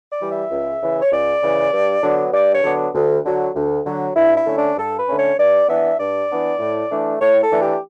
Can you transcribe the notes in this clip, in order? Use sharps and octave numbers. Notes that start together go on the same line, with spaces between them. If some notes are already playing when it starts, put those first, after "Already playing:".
D5
E3 G3
E5
C#2
C#3 E3
C#5
C#2 D5
C#3 E3
G2
D3 F#3 B3 D4
G2 D5
C#5
D3 F#3 B3 D4
D2
D3 F#3
D2
D3 F#3
G2 E4
E4
D3 A3 C#4
D4
G2 A4
B4
D3 A3 C#4
C#5
G2 D5
E3 B3 D4 E5
G2 D5
E3 B3 D4
A2
E3 A3 D4
A2 C#5
A4
E3 A3 D4
G4